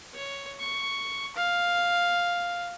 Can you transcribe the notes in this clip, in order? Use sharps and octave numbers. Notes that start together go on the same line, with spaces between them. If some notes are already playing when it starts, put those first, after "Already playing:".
C#5
C#6
F5